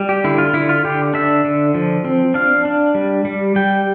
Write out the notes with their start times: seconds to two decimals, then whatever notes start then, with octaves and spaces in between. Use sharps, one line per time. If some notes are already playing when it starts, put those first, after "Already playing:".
Already playing: G3
0.09 G4
0.24 D3 E4
0.38 F4
0.53 D3 E4
0.69 F4
0.85 D3 G4
1.14 D4 E5
1.45 D3
1.74 F3
2.05 C4
2.34 D4 F5
2.65 D4
2.95 G3
3.25 G3
3.56 G3 G5